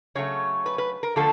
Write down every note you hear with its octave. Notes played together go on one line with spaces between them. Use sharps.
C#3 F#3 A3 C#5
B4
B4
A#4
D3 F3 A3 A4